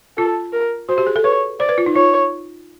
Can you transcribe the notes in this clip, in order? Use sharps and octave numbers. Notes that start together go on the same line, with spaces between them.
F4 A4
A#4
F#4 C5
G4
G#4
A4
B4 C#5
C5 D5
B4
F4
D#4
F4 C#5